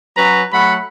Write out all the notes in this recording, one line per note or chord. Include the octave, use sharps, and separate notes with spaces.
F#3 C#4 B4 A#5
F#3 A3 F#5 B5